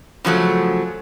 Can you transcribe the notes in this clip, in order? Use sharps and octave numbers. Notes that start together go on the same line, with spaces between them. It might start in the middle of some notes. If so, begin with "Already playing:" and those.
C#3 F3 F#3 A3